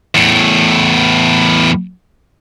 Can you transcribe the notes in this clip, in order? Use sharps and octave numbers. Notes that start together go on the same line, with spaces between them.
E2 A2